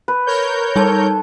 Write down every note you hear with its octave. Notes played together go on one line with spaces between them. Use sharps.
B4
A#4 C#5 G6
G3 D#4 A4 A5